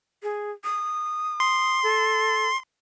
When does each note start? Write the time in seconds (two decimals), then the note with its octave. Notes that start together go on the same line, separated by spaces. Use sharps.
0.23 G#4
0.64 D#6
1.40 C6
1.83 A4